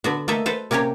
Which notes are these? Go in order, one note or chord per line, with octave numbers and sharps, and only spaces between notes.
D3 B3 F#4
A3 A#3 A4 D#5 E5
A4 B4 C5
C3 A#3 C#4 G4 C#5